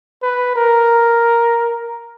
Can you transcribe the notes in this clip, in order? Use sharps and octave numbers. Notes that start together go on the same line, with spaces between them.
B4
A#4